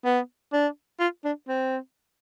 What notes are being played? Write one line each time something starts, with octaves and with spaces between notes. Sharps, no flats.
B3
D4
F4
D4
C4